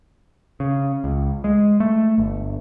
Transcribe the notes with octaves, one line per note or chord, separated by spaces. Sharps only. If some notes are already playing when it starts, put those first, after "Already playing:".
C#3
C#2
G#3
A3
G1